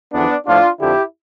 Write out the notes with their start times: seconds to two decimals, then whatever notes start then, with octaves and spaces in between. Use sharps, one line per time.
0.12 E2 D3 F3 B3 D4
0.46 A2 F3 D4 F4
0.80 F2 D3 F3 E4 G4